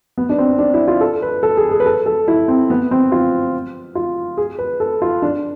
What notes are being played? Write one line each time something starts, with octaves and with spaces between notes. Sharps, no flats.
B3
D4
C4
D4
E4
F4
A4
B4
A4
G#4
G#4
B4
A4
A4
E4
C4
B3
C4
F4
F4
G#4
B4
A4
F4
D4